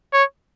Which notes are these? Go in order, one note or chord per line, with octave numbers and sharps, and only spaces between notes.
C#5